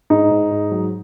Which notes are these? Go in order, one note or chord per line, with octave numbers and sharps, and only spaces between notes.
G#2 D#4
G#2
G#2
F#3